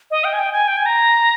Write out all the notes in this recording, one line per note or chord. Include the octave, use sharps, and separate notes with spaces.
D#5
G5
G#5
G5
G#5
G5
G#5
A#5